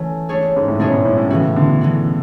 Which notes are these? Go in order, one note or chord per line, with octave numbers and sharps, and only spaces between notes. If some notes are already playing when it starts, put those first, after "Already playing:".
Already playing: E3 A3 C#4
A3 D4 G#4 C#5
G#2
A2
G#2 B2 A3 D4 G#4 C#5
G#2
A2
A2
A2 C#3 E3 B3 F#4
B2 D3
E3 B3 F#4